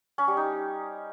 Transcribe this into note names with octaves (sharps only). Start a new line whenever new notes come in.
C#4
G3
D#4